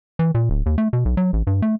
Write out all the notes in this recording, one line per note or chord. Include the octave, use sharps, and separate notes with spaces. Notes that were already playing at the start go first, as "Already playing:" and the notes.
E3
A#2
D1
D#2
A3
B2
B1
F#3
A1
G2
A3